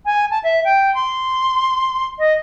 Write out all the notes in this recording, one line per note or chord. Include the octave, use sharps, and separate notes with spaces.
G#5
A5
E5
G5
C6
D#5